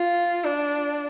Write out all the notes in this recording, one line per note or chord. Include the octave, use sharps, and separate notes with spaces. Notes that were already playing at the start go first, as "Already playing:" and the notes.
Already playing: F4
D4